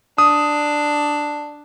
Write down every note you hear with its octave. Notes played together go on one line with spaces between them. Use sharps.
D4 D#6